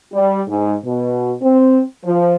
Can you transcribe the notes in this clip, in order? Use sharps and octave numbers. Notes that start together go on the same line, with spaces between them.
G3
G#2
B2
C4
F3